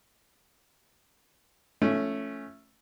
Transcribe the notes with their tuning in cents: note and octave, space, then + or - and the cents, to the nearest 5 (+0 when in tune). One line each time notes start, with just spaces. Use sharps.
F3 -35 A3 +0 C#4 +0